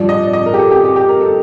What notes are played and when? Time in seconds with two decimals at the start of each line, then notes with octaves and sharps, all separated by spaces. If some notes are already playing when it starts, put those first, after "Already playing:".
Already playing: G2 F3 D5
0.09 D#5
0.23 D5
0.33 D#5
0.46 A#4
0.54 G4
0.58 A4
0.71 G4
0.84 G4
0.96 G4
1.09 A#4
1.21 A4